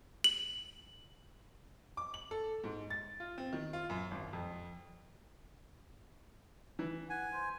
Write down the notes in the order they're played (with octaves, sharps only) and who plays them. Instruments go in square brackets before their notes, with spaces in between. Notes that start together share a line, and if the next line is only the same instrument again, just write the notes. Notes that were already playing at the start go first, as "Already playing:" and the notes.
[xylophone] F#7
[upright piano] D6
F#7
A4
G#2
A6
F4
C4
D#3
F4
F#2
G#1
F2
[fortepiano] E3
[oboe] F#5 [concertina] G#5
[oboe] C5